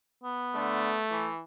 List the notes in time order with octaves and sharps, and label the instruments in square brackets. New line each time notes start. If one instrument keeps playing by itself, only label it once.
[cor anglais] B3
[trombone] D3 [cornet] A3
[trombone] E3